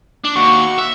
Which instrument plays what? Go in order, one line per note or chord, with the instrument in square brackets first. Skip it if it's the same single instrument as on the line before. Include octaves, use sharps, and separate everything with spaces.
[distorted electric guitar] D4
[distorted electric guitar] D#2 [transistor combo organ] F#4 C#6
[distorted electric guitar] E5